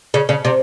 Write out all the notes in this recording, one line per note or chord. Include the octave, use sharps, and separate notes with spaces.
C#3
C#3
C3